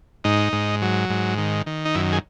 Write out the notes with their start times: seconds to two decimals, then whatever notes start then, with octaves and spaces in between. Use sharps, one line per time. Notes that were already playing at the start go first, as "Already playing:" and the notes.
0.24 G#2 D#4
0.53 G#2
0.82 F#3
1.10 G#2
1.38 D#3
1.66 D#3
1.85 D#4
1.95 F#2 E4
2.13 G#4